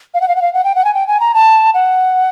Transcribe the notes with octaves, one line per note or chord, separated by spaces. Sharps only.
F5
F#5
F5
F#5
F5
F#5
G5
F#5
G#5
G5
G#5
A#5
A5
F#5